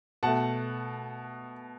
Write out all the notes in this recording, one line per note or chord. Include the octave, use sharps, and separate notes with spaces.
B2 A3 F#5 A5